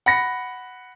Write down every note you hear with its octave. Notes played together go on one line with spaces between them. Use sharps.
F#5 B5 A#6 C#7